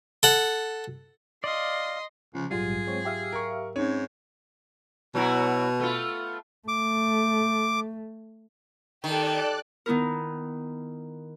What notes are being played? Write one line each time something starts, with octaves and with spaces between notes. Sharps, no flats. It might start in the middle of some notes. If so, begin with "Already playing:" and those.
A4 F#5
D5 D#5 F5 C6
C#2 C#3 F3
A#1 G#2 F#3 G3 F4 G#4
G#3 C4 C#5
G4 E5 F5
A#4 C#6
G#2 C4 C#4 D#4 C#5
B2 F#3 E4 F#4
A3 B3 F4
A3 D6
D#3 G4 A4 D5 F#6
D#3 B3 E4 A#4